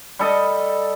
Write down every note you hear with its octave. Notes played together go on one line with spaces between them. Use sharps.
G3 A4 D#5